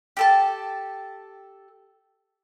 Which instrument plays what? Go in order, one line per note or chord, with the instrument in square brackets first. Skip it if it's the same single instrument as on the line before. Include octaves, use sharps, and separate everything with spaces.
[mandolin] G4 A4 A5